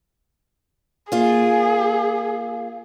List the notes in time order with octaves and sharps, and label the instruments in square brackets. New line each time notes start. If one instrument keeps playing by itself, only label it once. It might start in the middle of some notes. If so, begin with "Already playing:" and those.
[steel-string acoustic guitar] A#3 F4 [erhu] G#4